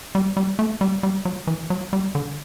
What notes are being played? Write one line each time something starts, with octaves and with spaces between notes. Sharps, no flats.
G3
G3
A3
G3
G3
F#3
E3
F#3
G3
D3